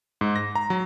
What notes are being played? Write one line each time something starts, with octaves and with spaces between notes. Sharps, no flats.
G#2
A#6
A#5
F#3